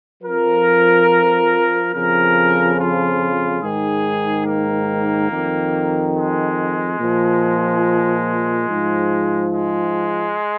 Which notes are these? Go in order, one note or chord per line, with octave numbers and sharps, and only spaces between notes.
F2 F3 A#4
F2 C#3 F3 A#4
F4
G#2 D#3 G#4
A#3
F2 D#3
G#3
A#2 F3
G#2 F3
G#3